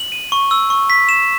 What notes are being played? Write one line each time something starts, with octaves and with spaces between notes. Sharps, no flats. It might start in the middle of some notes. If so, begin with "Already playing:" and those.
Already playing: F#7
D#7
C#6
E6
C#6
B6
E7